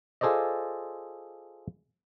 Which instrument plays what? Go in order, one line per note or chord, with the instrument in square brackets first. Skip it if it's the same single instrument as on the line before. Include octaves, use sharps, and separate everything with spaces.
[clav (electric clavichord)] F4 G#4 A4 C5 D5 D#5